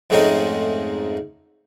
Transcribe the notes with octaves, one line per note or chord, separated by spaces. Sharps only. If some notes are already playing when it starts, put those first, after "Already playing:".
F2 G#2 A3 C4 C#4 D#4